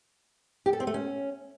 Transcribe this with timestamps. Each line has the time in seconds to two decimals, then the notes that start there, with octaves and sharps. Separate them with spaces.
0.66 G4
0.73 A4
0.80 C4
0.87 A3
0.94 C#4